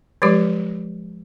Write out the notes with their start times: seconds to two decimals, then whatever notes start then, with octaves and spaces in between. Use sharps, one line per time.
0.22 F3 F#3 G#3 G4